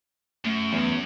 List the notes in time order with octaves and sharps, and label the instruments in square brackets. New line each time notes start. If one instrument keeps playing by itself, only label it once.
[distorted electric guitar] F#2 [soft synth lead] A3
[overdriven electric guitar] E2